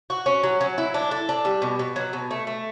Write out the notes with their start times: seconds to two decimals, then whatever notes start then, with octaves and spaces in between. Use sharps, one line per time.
0.10 F#4
0.26 C#4
0.43 F#3
0.61 F#3
0.78 E4
0.94 D4
1.11 A4
1.29 D4
1.45 G3
1.62 B2
1.79 B2
1.96 F#3
2.13 B2
2.31 A3
2.47 A3